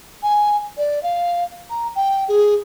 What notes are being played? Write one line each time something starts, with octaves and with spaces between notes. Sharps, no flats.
G#5
D5
F5
A#5
G5
G#4